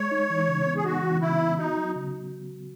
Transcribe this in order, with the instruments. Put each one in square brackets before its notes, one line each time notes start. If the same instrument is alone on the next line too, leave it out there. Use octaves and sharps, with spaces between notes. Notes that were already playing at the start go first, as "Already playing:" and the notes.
Already playing: [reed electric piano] G#3 [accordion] C#5
[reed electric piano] D#4
E3
C#3
B3
[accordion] G#4
[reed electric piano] D#4 [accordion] F#4
[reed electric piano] E3
[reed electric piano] C#3 [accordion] E4
[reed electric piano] B3
[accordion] D#4 [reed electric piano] F#4
[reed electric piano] F#3
C#3